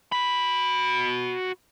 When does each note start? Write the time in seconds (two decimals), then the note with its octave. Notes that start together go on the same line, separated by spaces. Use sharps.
0.12 F#4 B5